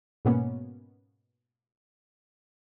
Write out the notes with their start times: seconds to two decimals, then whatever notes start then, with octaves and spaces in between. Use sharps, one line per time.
0.25 G#2 B2 A#3 B3 C#4